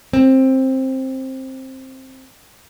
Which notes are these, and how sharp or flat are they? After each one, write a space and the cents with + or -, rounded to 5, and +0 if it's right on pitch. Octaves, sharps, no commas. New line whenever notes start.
C4 +10